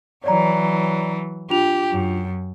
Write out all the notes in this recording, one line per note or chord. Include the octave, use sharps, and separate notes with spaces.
E3 F#3 C#5 D5 A#5
D4 F4 G4 F7
F#2